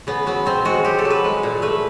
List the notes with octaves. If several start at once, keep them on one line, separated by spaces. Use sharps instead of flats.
C#3 B3
F#3 B3
B2 C4
G#3 F#4
F#3 G4
A4
F#3
B4
G#3
A#2
A3 B4